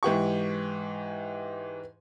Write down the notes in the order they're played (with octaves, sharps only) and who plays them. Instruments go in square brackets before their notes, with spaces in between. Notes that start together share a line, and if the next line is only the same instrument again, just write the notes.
[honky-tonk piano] G#2 E3 G4 C#6